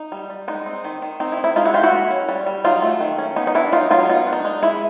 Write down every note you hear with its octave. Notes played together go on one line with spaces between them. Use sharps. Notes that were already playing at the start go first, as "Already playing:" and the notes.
Already playing: D#4
G3
G3
G#3 D#4
C4
D#3
D#3
C4 D#4
E4
D#4
E4
G#3 D#4 F4
E4 F#4
G#3 F4 G4
E4 F#4
A#3
C#4
G3
G3
F#3 D#4 F4
A3
D#3
C#4
B3 D#4
D#4
D4 E4
F#3 D#4 F4
F#3 D#4 F4
B3 D#4 F4
D4
D#4
G#3 D#4
G#3 E4